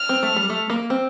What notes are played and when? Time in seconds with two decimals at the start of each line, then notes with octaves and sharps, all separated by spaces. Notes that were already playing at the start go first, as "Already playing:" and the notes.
Already playing: F6
0.09 C4
0.23 A3
0.36 G3
0.50 A3
0.70 A#3
0.90 C4